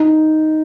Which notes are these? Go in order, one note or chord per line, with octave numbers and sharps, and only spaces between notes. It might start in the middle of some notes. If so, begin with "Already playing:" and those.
Already playing: D#4